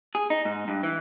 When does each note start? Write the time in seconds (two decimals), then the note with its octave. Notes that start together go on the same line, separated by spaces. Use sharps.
0.15 G#4
0.30 D#4
0.45 G#2
0.68 G2
0.83 E3